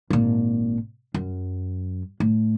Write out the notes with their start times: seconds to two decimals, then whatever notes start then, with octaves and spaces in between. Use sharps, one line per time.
0.10 G#1 A#2
1.14 F#2
2.20 A2